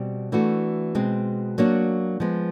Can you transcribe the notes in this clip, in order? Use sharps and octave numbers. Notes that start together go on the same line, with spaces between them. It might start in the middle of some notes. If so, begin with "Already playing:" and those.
Already playing: B2 G3 C4
E3 A3 D4 F#4
B2 G#3 C4
F#3 A#3 D4 F#4
F3 G#3 B3